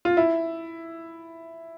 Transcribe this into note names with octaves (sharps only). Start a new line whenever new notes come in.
F4
E4